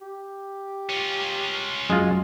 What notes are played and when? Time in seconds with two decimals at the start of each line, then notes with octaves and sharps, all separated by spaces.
0.01 G4
0.89 C#4 F4
1.90 F#2 G#3 F4